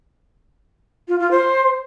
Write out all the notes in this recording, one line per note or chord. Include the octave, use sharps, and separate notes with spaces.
F4
F4
C5